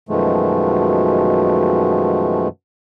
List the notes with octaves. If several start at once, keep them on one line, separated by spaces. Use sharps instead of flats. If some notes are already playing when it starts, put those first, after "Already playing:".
F#2 B2 D#3 F3 G#3 A3